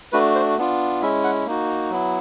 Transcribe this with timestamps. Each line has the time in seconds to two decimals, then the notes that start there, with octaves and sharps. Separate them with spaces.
0.12 A3 D4 F#4 B4
0.35 C5
0.58 B3 D4 F4
1.02 G#3 C#4 E4 E5
1.24 F#5
1.46 A#3 D#4 F#4
1.90 F#3 B3 E4